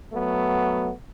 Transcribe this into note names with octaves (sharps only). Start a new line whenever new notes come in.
F#3 A3 B3